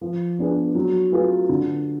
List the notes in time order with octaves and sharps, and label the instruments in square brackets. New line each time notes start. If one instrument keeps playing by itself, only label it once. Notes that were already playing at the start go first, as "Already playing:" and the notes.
[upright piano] F3
B3 D4 G#4
F#3
A3 F4 G#4 B4
D3